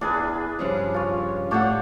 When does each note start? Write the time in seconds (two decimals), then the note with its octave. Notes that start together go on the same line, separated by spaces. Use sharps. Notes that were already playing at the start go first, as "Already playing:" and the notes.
0.01 E2 D4 G#4 B4
0.59 G2 C#3 F3
0.94 F4 C#5
1.51 A2 D4 G4 C#5 E5 F#5